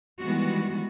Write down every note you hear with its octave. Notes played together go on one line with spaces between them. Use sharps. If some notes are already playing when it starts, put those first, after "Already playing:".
D#3 E3 G3 G#3 B3 F#4